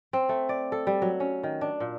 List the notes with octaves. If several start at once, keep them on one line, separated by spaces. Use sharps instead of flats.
C4
A3
D5
A4
G3
F#3
C#4
D#3
D4
A#2